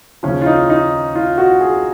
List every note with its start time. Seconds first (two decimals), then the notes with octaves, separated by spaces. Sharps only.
0.23 D#2 C#3 F3 C#4
0.42 F4
0.46 D#4
0.70 D#4
1.15 F4
1.38 F#4
1.61 G#4